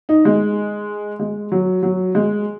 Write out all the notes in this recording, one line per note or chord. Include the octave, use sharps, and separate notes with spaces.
D#4
G#3
G#3
F#3
F#3
G#3